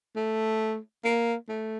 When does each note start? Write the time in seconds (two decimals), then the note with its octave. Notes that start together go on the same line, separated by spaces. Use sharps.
0.16 A3
1.05 A#3
1.49 A3